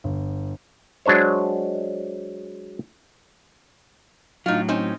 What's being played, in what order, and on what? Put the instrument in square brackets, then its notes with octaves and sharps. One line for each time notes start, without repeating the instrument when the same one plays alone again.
[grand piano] G1
[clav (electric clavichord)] F#3 G#3 D4 C5 C#5
[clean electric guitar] A2 F#3 [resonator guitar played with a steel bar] D#4 F4
[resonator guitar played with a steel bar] C4 C#4 D#4